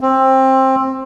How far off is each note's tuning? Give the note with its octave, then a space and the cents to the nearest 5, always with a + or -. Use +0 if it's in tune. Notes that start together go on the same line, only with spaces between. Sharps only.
C4 +20